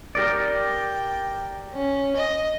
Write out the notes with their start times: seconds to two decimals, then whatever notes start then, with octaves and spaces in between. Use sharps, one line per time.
0.15 G4 A#4 D5
0.58 G5
1.74 C#4
2.17 D#5